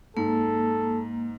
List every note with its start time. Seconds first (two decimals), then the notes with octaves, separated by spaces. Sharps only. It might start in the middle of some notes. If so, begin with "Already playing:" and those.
0.17 G#2 A#3 A4